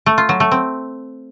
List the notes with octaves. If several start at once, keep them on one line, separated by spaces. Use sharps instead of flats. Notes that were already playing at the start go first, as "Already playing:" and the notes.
A3
F4
F#3
A3
C4